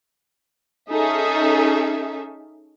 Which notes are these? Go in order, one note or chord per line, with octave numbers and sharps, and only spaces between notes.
C#4 D#4 G#4 A4 E5